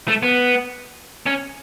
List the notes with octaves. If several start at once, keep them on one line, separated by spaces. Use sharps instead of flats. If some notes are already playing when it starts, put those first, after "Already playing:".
A3
B3
C#4